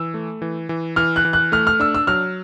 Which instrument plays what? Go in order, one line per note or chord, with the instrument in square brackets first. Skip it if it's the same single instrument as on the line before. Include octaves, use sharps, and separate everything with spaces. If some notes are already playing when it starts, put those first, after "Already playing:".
Already playing: [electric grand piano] E3 [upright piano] E6
[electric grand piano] A3
E3
E3
[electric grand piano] E3 [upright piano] F6
[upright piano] F#6
[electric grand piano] E3
[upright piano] F#6
[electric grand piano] A3 [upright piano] F6
[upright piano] F6
[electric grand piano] D4 [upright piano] E6
[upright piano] E6
[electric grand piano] F#3 [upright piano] F6